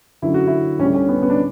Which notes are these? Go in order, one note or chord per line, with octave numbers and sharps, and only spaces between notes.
F#2 D3 F#3 E4
F#4
E4
D2 D3 G3 C#4
C#4
B3
B3
D4